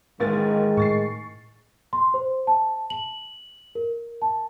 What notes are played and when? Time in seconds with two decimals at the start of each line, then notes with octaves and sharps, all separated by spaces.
0.20 A1 D#3 G#3 A#3 A6
0.77 A2 C#6 A6 C7
1.93 C6
2.14 C5
2.47 A5
2.90 F#7
3.75 A#4
4.22 A5